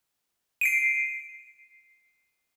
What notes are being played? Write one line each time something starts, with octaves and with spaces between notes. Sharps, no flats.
C7 D7 D#7